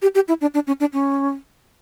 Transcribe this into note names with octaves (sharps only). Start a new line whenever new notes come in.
G4
G4
E4
D4
D4
C#4
D4
C#4